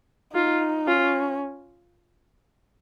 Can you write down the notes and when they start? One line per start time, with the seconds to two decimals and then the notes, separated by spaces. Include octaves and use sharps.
0.34 D#4 F4
0.87 C#4 F4